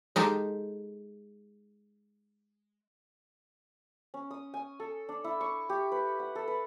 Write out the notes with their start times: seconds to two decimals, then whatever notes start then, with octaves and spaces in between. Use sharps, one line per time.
0.16 G#3 D#4 G4 A4
4.14 C#4
4.31 D#6
4.54 G#5
4.80 A4
5.09 D4
5.24 E4
5.41 C#6
5.69 G4
5.92 B4
6.19 F#5
6.35 A4
6.48 B4